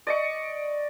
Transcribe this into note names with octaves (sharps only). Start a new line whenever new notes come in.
D5 D#5 C#6